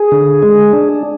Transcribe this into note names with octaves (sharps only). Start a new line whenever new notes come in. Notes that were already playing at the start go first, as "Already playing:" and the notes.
Already playing: G#4
D3
G#3
D4